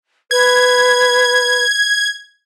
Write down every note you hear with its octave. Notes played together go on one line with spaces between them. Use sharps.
B4 G#6